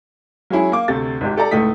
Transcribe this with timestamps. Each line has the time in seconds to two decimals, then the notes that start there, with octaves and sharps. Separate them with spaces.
0.50 F#3 G#3 C#4 E4 G#4
0.72 A#3 D6
0.88 D2 C3 A3 A6
1.21 G#1 G#2 G4
1.36 G4 A4 D5 A#5
1.51 C#2 A2 A3 D#4 D#6 B6